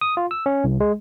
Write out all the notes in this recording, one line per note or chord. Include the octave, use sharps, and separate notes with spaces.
D#6
F4
E6
C#4
C2
G#3